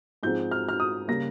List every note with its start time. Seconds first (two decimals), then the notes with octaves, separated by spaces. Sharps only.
0.23 G#2 F3 G#3 C4 G6
0.51 F6
0.69 F6
0.80 D#6
1.08 C#3 G3 A#3 A#6